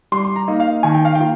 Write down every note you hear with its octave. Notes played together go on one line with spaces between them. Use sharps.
G3 C6
C6
A#5
A#3 D#4
F5
D#3 G#5
G5
F5
A#3 F4 G5